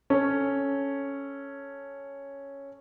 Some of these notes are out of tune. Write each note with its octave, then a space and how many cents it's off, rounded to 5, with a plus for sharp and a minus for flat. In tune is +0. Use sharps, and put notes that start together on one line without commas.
C#4 +0 A4 +0